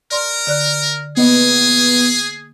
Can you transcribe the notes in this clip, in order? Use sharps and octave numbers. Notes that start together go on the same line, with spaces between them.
A#4 D5 C6
D3 D5 F#6
A#3 B3 G#4 D#5